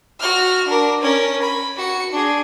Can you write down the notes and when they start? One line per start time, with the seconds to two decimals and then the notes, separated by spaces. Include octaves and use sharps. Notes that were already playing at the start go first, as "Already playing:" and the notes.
0.20 F#4 F6
0.68 D4 A#4
1.01 C#4 A#4
1.42 B5
1.77 F#4 C#7
2.12 D4 G#4